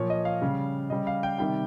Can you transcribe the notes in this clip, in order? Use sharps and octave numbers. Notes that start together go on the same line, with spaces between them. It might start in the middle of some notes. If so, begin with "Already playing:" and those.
Already playing: A#2 F3 C#5
D#5
F5
C#3 G3
C#3 G3 D#5
F5
G5
C3 D#3 G3 G5